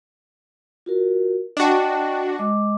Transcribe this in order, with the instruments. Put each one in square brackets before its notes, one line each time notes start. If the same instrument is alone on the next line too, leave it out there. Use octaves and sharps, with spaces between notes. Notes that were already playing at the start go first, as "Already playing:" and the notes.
[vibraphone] F4 F#4 A#4
[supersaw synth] D4 F#4 [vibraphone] D#5 G5 A5
[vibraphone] G#3 D#5 D6